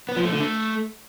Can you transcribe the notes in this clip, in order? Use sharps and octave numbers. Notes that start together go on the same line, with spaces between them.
B3
F3
A3
D3
A3